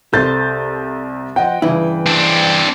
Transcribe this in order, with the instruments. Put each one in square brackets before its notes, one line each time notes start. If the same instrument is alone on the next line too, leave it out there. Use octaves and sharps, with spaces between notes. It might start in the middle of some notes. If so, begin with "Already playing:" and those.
[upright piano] C2 G6 A6 [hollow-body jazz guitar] A4 C5
[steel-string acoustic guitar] F3 D#5 F#5 [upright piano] G5
[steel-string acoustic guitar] G2 C#3 E3 [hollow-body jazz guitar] E4
[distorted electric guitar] C4 D4